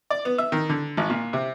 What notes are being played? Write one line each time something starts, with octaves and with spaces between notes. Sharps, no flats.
D5
B3
E5
D#3
D3
G#1
A#2
C3